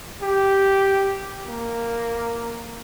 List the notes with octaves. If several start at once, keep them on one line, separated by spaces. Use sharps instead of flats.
G4
A#3